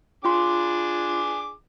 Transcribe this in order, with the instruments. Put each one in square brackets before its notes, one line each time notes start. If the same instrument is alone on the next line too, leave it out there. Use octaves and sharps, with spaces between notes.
[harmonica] D4 G#4 D6 [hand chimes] F4 C6